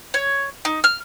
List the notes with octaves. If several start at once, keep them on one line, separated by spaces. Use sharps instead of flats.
C#5
D#4
F6